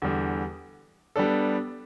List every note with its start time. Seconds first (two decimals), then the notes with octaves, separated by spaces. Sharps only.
0.02 E2 D3 G3
1.16 G3 B3 D4 A4